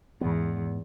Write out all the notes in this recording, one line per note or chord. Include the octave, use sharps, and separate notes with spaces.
E2 G#2 B3